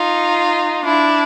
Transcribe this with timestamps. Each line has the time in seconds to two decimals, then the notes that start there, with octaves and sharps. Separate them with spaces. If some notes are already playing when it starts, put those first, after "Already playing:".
Already playing: D#4 F4
0.84 D4 E4